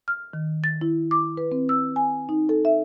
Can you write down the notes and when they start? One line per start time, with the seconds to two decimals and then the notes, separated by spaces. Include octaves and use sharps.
0.08 F6
0.33 D#3
0.64 A6
0.81 E4
1.11 D6
1.37 B4
1.52 C4
1.69 E6
1.96 G#5
2.29 D#4
2.49 A4
2.65 E5